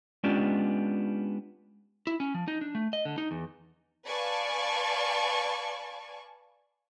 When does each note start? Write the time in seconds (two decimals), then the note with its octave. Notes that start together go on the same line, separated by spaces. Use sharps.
0.24 G#3 B3 C#4 D4 F4 G4
2.07 E4
2.20 C#4
2.34 F3
2.48 D#4
2.61 D4
2.75 A3
2.93 D#5
3.05 D3
3.18 D#4
3.31 E2
4.07 B4 D5 F5 G#5 A5 C#6